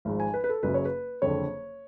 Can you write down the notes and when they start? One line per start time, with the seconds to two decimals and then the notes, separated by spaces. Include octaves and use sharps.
0.05 G#1 G#2 F3
0.20 G#5
0.34 B4
0.44 B4
0.49 A4
0.63 F#1 F#2 C#3 F#3 B4
0.74 C#5
0.85 B4
1.22 F#1 F2 D3 C#5